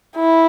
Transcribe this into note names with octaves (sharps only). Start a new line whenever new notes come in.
E4